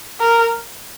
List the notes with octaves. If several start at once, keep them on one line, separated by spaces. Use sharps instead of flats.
A#4